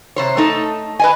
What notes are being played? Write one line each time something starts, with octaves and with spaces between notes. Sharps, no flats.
C3 C5 C#5
A3 D#4 A4
B4 D#5 G#5